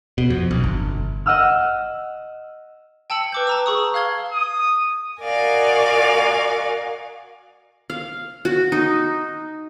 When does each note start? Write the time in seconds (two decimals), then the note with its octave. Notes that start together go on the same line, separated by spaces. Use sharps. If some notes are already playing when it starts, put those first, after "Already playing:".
0.18 B2
0.30 F2
0.51 B1
0.64 G1
1.26 D#5 F#5 E6 F6
3.10 G5 A5 E6 C#7 F#7
3.32 B4 D6 G6
3.47 A5 A#5 E6
3.66 G#4 C#6 D#6
3.94 F5 F6 G#6 G7
4.32 D#6
5.22 F#4 A#4 D5 D#5 F5 G#5
7.90 F5
8.45 F#4
8.72 D#4